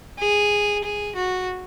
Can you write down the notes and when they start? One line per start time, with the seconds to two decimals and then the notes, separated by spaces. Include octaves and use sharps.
0.19 G#4
0.84 G#4
1.15 F#4